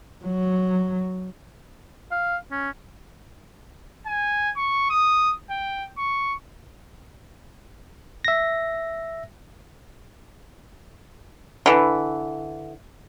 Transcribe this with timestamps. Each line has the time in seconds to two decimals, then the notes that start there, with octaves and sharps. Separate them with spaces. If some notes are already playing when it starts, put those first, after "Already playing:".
0.25 F#3
2.12 F5
2.51 C#4
4.07 G#5
4.57 C#6
4.90 D#6
5.51 G5
5.98 C#6
8.25 E5 A#6
11.66 D3 E3